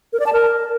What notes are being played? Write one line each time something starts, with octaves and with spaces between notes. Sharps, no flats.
A#4
D5
A5
A#4